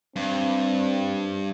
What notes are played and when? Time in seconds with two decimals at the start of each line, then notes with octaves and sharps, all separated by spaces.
0.16 G2 C4